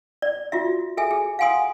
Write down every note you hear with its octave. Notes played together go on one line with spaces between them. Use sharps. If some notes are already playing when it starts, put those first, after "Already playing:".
D5
F4 F#4 E5
G#4 A4 E5 G#5
G#4
F5 F#5 G#5 C6 D#6